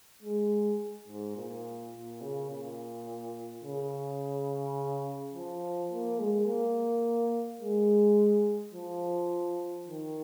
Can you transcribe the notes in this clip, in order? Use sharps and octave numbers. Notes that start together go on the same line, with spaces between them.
G#3
G#2
A#2
A#2
C#3
A#2
C#3
F3
A#3
G#3
A#3
G#3
F3
D#3